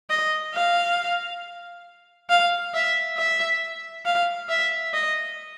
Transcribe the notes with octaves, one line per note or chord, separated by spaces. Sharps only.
D#5
F5
F5
E5
E5
F5
E5
D#5